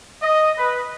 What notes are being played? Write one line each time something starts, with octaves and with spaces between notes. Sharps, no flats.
D#5
B4